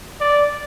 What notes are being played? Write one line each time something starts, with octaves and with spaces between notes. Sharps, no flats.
D5